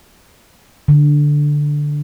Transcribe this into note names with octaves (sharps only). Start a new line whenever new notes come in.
D3